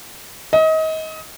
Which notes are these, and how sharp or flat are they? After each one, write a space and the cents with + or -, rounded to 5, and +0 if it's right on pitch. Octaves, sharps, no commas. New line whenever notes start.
D#5 +30